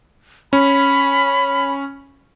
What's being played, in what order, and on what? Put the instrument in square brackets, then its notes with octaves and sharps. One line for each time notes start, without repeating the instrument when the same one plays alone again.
[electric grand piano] C#4 [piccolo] B5